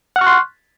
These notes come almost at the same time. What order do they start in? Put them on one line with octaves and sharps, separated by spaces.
F#5 F6 C#6 F#6 C6